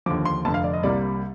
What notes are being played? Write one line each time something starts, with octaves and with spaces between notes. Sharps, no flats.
D#2 D3 F3 D6
C6
F1 F2 D3 A5
F5
D5
D#5
C2 C3 G3 A#3 D5